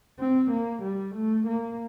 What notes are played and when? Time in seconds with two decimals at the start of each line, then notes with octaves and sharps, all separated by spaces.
0.20 C4
0.51 A#3
0.83 G3
1.15 A3
1.48 A#3